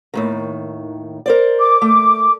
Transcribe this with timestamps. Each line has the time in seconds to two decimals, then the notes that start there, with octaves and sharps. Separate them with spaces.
0.14 D#2 A2 D#3
1.26 A#4 C5 D5
1.59 D6
1.82 A3